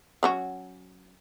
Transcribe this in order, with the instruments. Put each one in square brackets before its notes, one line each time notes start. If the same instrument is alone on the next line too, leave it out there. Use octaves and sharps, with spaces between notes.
[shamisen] F#3 C#4 F#4